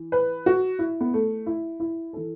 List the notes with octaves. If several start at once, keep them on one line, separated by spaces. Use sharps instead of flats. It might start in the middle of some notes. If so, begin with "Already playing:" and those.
Already playing: E3
B4
F#4
E4
B3
A3
E4
E4
E3 A4